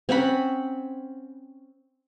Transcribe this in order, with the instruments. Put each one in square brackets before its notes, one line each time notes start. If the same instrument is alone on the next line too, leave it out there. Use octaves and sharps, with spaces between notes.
[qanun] C4 C#4 F#5 B5